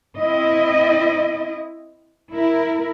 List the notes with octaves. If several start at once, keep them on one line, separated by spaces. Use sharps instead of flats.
C4 E4 D#5
E4 A#4